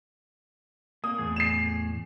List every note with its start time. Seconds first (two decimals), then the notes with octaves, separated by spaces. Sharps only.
1.04 A#3 D#6
1.18 E2 A2 G#4
1.36 C7 E7